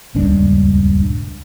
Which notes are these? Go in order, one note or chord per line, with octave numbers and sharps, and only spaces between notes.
D#1 C#2 G2 D4